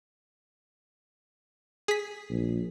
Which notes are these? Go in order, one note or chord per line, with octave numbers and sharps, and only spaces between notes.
G#4 B6
A#1